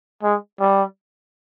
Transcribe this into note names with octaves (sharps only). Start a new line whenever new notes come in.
G#3
G3